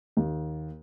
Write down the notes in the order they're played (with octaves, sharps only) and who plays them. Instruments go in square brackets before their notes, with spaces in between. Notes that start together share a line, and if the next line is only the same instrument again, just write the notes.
[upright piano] D#2